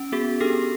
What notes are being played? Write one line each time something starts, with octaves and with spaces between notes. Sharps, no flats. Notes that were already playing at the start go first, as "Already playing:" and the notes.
Already playing: C#4
B3 F#4 G#4
D4 G4 A4